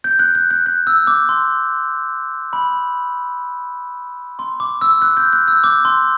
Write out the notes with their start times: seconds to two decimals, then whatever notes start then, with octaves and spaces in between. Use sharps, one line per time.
0.04 G6
0.19 F#6
0.35 F#6
0.51 F#6
0.66 F#6
0.87 E6
1.07 D6
1.29 C6
2.53 B5
4.39 C6
4.60 D6
4.81 E6
5.02 F#6
5.17 G6
5.33 F#6
5.48 E6
5.64 D6
5.85 C6